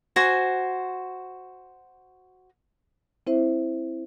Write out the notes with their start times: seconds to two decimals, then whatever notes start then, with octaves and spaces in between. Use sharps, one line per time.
0.16 F#4 C5 G#5
3.27 C4 E4 C5 E5